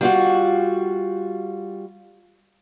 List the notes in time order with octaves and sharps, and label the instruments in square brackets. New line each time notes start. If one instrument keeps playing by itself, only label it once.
[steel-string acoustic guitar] G3 F4 F#4